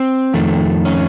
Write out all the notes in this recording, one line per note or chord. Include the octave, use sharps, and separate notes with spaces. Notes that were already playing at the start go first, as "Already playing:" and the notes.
Already playing: C4
F2 D#3 A3
C#4